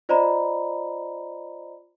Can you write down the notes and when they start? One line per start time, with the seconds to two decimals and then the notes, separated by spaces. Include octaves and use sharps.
0.09 F4 C5 D5 D#5 A#5 B5